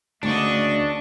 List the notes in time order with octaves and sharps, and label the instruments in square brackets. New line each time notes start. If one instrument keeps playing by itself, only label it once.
[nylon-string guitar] D2 [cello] C#3 A3 [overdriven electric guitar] D4 [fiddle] D#5 C#6